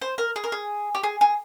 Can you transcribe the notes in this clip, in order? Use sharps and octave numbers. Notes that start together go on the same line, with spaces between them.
C5
A#4
G#4
A#4
G#4
G4
G#4
G#4